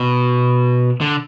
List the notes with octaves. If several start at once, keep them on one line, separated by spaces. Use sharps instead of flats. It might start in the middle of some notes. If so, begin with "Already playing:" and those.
Already playing: B2
D3